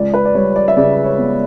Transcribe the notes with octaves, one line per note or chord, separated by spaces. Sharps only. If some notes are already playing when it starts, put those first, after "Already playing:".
Already playing: C#2 D5
B4
D5
G3 C#5
D5
E5
C#3 D5
C#5
B3